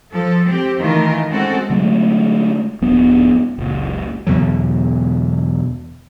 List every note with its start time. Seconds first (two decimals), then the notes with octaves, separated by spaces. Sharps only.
0.11 F3 A4
0.49 C4 G4
0.80 D#3 E3 A3 F4 A#4
1.29 G#3 C4 C#4 F#4 A4
1.70 D3 F#3 G#3 A3
2.81 D#1 G2 F3 B3
3.58 F#1 C#2 A#2
4.27 E2 B2 D3 F#3